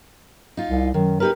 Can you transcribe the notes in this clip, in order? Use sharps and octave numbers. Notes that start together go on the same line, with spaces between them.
D#4 F4
C2
F#2 D#3
D#4 G4 A#4 B4